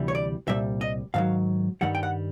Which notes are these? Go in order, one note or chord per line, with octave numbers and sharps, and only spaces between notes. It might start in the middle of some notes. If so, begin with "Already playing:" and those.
Already playing: D2 C3 E3 G3
C#5
D5
C2 A#2 G3 E5
D#5
G#2 D#3 F#3 F5
G2 D#3 G3 F#5
G5
F#5